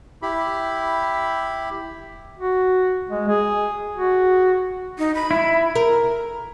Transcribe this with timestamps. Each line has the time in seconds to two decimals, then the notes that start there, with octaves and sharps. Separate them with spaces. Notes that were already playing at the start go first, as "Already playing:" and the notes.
0.22 E4 G4 B5
2.38 F#4
3.09 G#3
3.28 G#4
3.94 F#4
4.99 D#4
5.15 B5
5.31 E4
5.76 A#4